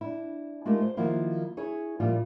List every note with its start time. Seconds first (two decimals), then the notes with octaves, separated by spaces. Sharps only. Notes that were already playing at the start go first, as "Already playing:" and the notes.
0.01 D4 E4
0.66 G#3 A3 D#4 F4 G4 A#4
0.82 C5
0.97 D#3 F3 F#3 A#3 E4 F4
1.57 E4 G#4 C#5
2.00 A#2 F3 G3 E4 F4